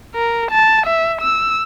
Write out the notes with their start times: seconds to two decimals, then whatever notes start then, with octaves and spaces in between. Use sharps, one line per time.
0.15 A#4
0.51 A5
0.86 E5
1.21 E6